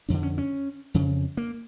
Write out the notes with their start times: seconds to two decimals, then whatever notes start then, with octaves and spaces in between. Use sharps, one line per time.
0.09 F2 D3 D4
0.23 C#4
0.38 C#4
0.94 F2 C#3
1.37 A#3